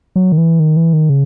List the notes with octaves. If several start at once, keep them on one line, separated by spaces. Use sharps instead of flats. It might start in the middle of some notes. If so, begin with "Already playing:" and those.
F#3
D#3
E3
D#3
E3
D#3
C#3